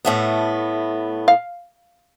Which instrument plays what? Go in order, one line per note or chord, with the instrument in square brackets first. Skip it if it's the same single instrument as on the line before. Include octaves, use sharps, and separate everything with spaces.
[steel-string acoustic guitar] A2 A3 B3
[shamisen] F5